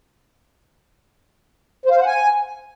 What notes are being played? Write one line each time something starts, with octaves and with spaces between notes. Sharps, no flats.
C5
F5
C5
F#5
G#5